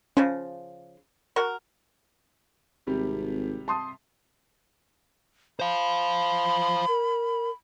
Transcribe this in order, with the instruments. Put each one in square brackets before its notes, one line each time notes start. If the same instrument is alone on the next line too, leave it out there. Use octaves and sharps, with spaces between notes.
[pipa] C#3 F3 [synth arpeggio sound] C#4
[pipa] F#4 A#4
[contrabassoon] G#1 [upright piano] C3 G3
[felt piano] A5 C6 D#6
[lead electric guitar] C5 F5 [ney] B5
[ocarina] A#4